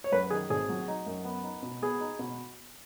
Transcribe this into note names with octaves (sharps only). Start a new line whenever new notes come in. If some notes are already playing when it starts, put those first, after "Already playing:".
C#5
F#2 B4
D#3 G#4
G#1 G#4
F#3
D#4
F#2
B3
D#4
B2
B3 G#4
D#4
B2